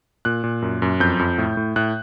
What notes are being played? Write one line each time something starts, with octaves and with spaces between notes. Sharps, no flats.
A#2 F#6
A#2
F#2
F#2
F2 G6
F2
A2
A2
A2 F#6